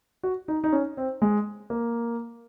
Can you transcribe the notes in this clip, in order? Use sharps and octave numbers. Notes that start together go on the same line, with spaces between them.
F#4
D#4
D#4
C#4
C4
G#3
A#3